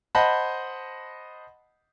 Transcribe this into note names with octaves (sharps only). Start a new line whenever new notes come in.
C5 D#5 F#5 A5 B5